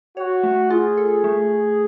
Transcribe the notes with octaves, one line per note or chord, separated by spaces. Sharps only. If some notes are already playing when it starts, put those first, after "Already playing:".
F#4 C#5
A3
F4 G#4
A4
A3